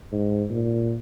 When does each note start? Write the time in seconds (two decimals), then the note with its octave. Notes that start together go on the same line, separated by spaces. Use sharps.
0.12 G#2
0.50 A#2